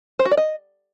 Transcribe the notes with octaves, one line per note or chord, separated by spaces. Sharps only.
C5
F#4
D5
D#5